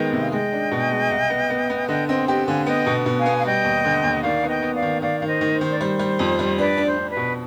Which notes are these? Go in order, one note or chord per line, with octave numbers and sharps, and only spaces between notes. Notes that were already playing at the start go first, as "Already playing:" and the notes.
Already playing: D#3 G#3 B3 D#5 G5
C3
F5
G#3 D#5 G5
D4
B2
G#3
C2
B3
B3
B3
D3 D#5 G5
C4 D#5 G5
G4 D#5 G5
D3 F5 G#5
B3 D#5 G5
B2
B2
F5 G#5
B3
F5
G3 D#5 G5
D#2
D3
D#2
D#3 D5 F5
B3
D#5 G5
B3
D5 F5
D#3
D#3 D5 F5
D#3 F5
C5 D#5
D#3
C5
D#3
D5
G3 C5
G3
F2
G3
D4 B4 D5
D4
C5
D4
B4
B2